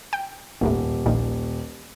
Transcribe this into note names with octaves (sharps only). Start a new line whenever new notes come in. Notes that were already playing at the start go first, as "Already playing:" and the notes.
G5
D#1 G#1 E2 A2
A#1 A#2 D#3